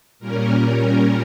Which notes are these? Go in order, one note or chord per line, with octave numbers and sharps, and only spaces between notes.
A#2 G3 C#4 A#4